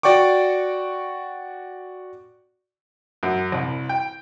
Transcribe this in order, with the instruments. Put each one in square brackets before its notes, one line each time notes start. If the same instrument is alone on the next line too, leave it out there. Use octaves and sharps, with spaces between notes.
[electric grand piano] F#4 D5 G5 C#6 D6
[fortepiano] F#2
C2
G5